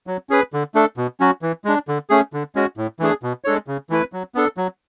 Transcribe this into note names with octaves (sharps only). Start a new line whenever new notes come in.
F#3
C#4 G#4 B4
D3
A3 D4 A4
B2
F#3 C#4 F#4
E3
G#3 D4
D3
A3 C#4 G#4
D3
G#3 C#4 F#4
A2
E3 A3 D4 G#4
B2
G#3 D4 A4 C#5
C#3
E3 A3 E4 B4
F#3
B3 D4 A4
F#3